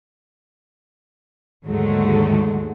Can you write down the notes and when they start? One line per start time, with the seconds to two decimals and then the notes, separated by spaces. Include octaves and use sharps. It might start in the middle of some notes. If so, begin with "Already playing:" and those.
1.65 D#2 G#2 D3 F#3 G#3 A3